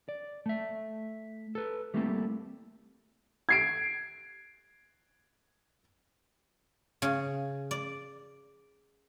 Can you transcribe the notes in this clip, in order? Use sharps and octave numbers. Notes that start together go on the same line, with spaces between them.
D5
A3 E5
A4 B4
G3 A3 A#3 C4 E4 A4
G#6 C7 D7
C#3
D5